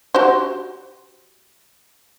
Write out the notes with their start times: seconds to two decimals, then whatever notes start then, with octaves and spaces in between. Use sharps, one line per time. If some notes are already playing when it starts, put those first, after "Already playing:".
0.14 F#4 G4 C5